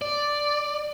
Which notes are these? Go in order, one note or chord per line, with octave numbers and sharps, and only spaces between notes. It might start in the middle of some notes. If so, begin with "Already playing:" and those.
D5